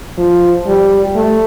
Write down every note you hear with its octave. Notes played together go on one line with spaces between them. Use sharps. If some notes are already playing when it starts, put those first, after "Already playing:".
F3
G3
A3